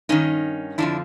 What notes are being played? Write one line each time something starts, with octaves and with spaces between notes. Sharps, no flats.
G2 D#3 C#4 D#4
F2 D3 F3 D4 E4